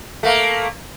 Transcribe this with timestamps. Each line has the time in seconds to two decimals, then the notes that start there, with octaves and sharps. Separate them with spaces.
0.23 A3 A#3